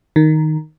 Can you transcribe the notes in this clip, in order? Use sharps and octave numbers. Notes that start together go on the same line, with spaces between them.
D#3